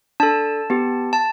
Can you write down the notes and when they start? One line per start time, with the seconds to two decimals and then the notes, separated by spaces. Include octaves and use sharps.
0.20 D4 A4 A5
0.70 B3 G4
1.13 A5